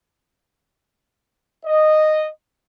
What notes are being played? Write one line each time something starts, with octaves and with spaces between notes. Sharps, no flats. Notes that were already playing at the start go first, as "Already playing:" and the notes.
D#5